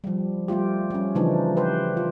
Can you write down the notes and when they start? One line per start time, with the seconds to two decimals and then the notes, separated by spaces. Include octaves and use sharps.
0.04 F3 G3
0.48 G3 A3 F4 G4
0.91 G3 C#4
1.15 C#3 E3 F3 A3 D4 D#4
1.57 G4 B4 C5
1.97 F4